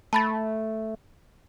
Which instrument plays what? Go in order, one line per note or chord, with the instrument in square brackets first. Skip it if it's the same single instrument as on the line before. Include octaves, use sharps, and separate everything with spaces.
[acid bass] A3 [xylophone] A5 B5 A6